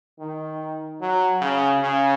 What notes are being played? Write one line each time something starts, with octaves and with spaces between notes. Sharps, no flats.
D#3
F#3
C#3
C#3